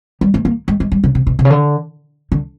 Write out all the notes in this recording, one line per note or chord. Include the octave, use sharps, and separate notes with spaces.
G3
A3
A#3
G#3
G#3
G3
C#3
C3
B2
C3
C#3
D3
D3